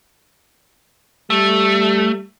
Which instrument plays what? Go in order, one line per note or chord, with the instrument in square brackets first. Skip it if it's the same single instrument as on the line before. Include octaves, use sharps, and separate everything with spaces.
[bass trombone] G3 [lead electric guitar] A3